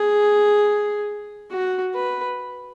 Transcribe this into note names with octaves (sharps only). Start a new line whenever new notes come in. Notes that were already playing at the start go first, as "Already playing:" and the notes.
Already playing: G#4
F#4
B4